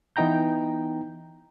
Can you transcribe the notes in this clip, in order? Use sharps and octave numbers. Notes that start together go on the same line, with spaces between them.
E3 B3 D#4 G5 A#5 G6